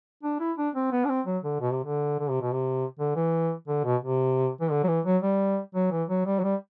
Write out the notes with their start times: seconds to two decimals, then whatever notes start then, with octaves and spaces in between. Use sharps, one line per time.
0.23 D4
0.40 E4
0.57 D4
0.75 C4
0.92 B3
1.05 D4
1.09 C4
1.26 F#3
1.44 D3
1.61 B2
1.72 C3
1.84 D3
2.19 D3
2.30 C3
2.41 B2
2.53 C3
2.99 D3
3.16 E3
3.68 D3
3.84 B2
4.02 C3
4.61 E3
4.71 D3
4.83 F#3
4.88 E3
5.05 F#3
5.22 G3
5.75 F#3
5.91 E3
6.09 F#3
6.26 G3
6.39 F#3
6.43 G3